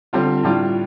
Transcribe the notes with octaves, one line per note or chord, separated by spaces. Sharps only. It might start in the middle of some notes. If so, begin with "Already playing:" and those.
D3 G3 C4 F4
A2 G3 D4 F4